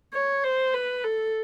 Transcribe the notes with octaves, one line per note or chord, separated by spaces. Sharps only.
C#5
C5
B4
A4